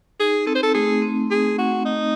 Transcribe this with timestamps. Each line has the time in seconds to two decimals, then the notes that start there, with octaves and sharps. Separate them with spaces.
0.20 D#4 G#4
0.46 C4 A4
0.55 C5
0.63 A4
0.74 A3 G#4
1.02 C4
1.31 G#4
1.59 F#4
1.85 D#4